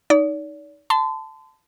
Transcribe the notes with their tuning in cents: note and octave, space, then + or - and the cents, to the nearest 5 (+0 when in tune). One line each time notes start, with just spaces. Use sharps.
D#4 +0 D5 -40
A5 +0 C6 -40